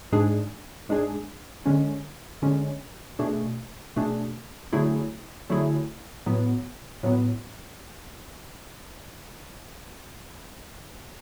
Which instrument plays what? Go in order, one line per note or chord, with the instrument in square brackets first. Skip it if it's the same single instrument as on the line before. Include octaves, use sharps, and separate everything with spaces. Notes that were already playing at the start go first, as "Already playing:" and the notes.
[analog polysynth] G#2 G#3 D4 G#4
G#2 G#3 D4 G#4
D3 G#3 C#4
D3 G#3 C#4
B2 A3 D4 G#4
B2 A3 D4 G#4
D3 F#3 A3 E4 G#4
D3 F#3 A3 E4 G#4
A2 F#3 B3
A2 F#3 B3